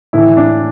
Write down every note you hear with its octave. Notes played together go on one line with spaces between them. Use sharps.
A2 E3 E4
D4